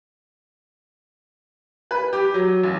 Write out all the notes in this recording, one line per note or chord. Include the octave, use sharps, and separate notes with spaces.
B4
G4
F#3
A1